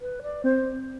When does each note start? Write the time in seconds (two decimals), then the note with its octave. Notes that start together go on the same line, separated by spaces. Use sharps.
0.01 B4
0.22 D5
0.44 C4 C5